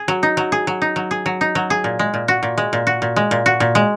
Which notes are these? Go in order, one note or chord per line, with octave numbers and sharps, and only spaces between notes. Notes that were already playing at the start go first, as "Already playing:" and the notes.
Already playing: G#4
F#3
D#4
F#3
G#4
F#3
D#4
F#3
G#4
F#3
D#4
F#3
G#4
A#2
G#3
A#2
F#4
A#2
G#3
A#2
F#4
A#2
G#3
A#2
F#4
A#2
G#3